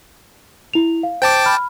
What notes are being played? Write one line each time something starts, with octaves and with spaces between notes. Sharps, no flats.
E4 F7
F5
C5 G5 A5 D6
B5 F6